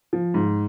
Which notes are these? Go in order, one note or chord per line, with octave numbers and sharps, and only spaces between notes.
F3
G#2